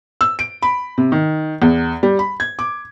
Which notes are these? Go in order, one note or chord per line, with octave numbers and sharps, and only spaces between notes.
E6
D7
B5
C3
D#3
E2
G3
B5
G#6
D6